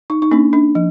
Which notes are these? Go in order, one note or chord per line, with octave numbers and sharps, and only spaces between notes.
D#4
D#4
A#3 C#4 D4
D4
F3